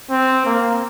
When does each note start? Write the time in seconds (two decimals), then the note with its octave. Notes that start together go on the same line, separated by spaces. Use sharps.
0.10 C4
0.46 A#3